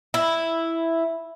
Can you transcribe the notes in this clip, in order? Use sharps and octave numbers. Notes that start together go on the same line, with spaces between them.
E4